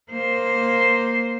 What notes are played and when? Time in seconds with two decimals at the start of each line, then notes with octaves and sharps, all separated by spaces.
0.11 A#3 C5